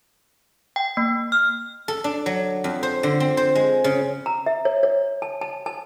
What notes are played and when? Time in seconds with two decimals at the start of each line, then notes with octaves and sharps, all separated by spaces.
0.76 G5
0.97 A#3
1.32 F6
1.88 A4
2.04 D4
2.26 F#3
2.64 F2
2.83 C5
3.03 D3
3.20 C4
3.37 C5
3.55 G#3
3.84 C#3
4.26 A#5
4.46 E5
4.65 C#5
4.83 C#5
5.22 A5
5.41 A5
5.66 A5